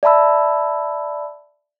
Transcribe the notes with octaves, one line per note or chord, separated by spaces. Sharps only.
D5 E5 A5 B5 E6